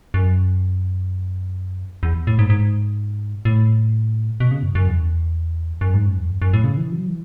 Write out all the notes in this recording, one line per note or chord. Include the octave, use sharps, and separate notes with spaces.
F#2
E2
A2
G#2
G#2
A2
B2
C#3
F#2
F#2
E2
F#2
G#2
F#2
E2
F#2
F#2
A2
C#3
E3
F#3
E3